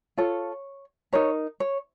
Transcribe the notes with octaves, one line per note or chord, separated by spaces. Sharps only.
F4 A4 C#5
D#4 A#4 C#5
C#5